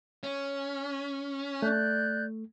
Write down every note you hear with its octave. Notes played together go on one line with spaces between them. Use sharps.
C#4
A3 D5 F#6 G6